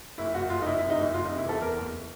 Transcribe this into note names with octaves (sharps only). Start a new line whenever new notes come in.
F#1 E4
F#1 F#4
F#1 F4
D#4
F#1 E4
E4
C3
D#4
F#1 E4
F#1 F4
D#4
C3
E4
E2 A4
E2 A#4
F#1